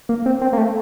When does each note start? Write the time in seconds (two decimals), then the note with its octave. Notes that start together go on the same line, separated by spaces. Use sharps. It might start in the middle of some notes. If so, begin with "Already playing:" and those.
0.09 A#3
0.26 C4
0.42 C4
0.53 A#3
0.57 A3